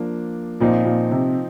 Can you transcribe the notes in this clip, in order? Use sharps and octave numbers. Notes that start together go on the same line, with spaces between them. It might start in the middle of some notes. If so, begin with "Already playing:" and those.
Already playing: F3 A#3 D4
A#2 F3 C4 D#4
A#2
C3